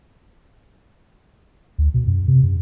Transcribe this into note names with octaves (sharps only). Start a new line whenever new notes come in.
D2
B2
F#2
C3
F#2